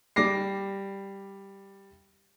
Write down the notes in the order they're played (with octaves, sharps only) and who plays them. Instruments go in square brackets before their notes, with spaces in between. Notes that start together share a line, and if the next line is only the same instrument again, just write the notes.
[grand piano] G3 D6 A#6 C7